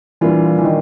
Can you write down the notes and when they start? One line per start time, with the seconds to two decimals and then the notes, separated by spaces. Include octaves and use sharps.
0.21 A#2 E3 G3 A#3 D4 F4
0.58 E3
0.64 D#3